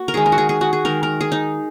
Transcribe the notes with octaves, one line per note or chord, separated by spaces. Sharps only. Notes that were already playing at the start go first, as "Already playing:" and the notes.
Already playing: A#3 F#4
A#4
D#3 G#3 G#4
A#4
F#4
G#4
G#4
F#4
G#4
D#3 G#3 A#4
A#4
G#4
D#4